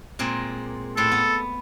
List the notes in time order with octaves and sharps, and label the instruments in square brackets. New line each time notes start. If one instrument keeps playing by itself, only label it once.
[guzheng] A#2 G#3 C4
[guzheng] A2 C4 C6 [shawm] A4
[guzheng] B3